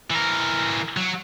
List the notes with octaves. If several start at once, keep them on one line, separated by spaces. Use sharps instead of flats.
E3 A#4
F#3